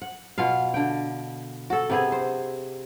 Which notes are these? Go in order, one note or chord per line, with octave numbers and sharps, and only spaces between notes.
F#5
B2 F4 F5
D3 G5
F#4 A4
C3 B3 G#4
C5